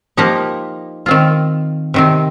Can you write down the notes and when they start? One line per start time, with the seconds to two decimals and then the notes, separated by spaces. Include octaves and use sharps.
0.17 F3 A#3 D#4 G4
1.06 D#3 C4 F4
1.94 C3 D#3 C4